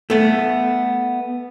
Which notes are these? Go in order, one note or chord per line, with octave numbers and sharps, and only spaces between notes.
A3 B3